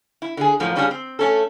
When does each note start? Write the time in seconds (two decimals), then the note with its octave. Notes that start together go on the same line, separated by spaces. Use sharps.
0.22 E4
0.37 D3 G#4
0.60 F#2 A2 F3 A#3
0.76 G3 C#4 D4 F4 F#4 G#4
0.91 C4
1.19 A3 C#4 A4